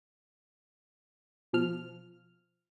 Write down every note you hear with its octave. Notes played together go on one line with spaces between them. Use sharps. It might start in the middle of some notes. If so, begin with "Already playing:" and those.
B2 F3 F6